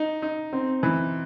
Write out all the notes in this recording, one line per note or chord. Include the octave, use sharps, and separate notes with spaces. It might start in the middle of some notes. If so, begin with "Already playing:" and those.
Already playing: D#4
D#4
C4
E3